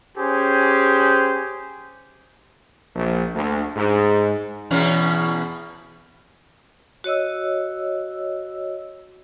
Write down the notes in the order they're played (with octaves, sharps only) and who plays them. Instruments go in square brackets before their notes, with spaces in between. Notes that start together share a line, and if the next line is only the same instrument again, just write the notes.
[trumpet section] C#4 G4 G#4 C5
[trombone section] A#1
D2
G#2
[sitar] E2 B2 C#4
[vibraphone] F#4 C#5 D#5 E6